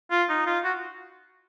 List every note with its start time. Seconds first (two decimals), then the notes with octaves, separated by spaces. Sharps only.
0.11 F4
0.29 D#4
0.47 F4
0.64 F#4